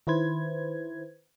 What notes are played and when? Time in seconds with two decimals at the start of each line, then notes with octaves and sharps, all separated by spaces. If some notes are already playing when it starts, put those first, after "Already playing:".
0.07 D#3 E4 B4 C5 G#6